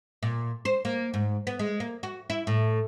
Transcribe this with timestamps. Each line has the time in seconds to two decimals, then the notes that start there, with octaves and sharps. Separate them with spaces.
0.23 A#2
0.65 C5
0.85 A#3
1.14 G#2
1.47 B3
1.59 G#3
1.80 A#3
2.03 F#4
2.30 E4
2.47 A2